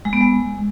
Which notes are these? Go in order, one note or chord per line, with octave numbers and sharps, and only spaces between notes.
G#3
B3
G#3